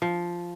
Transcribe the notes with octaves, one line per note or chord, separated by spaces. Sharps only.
F3